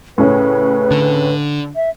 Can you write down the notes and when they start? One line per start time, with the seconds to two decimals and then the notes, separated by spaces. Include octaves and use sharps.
0.18 A2 C#3 C#4 B4
0.91 D3
1.76 E5